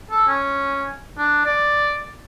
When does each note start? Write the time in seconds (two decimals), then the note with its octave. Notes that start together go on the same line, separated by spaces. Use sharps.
0.11 A4
0.27 C#4
1.18 D4
1.45 D5